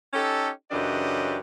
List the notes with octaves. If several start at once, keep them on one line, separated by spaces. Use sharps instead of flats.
C#4 D#4 G4 A4
F#2 C#3 E3 D4 G4 D#5